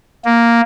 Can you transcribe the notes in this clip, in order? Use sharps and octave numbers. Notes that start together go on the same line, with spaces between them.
A#3